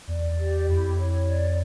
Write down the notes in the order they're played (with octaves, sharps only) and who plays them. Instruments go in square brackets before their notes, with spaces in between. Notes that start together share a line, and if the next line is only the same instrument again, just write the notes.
[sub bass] E2 [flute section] D5
[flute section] G4
[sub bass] F2 [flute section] E4
[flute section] C#5
D5